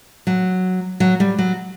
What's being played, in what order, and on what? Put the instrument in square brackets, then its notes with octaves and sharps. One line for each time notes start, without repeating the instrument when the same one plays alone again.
[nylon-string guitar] F#3
F#3
G3
F#3